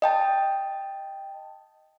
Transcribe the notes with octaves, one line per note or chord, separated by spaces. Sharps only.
D#5 G5 A5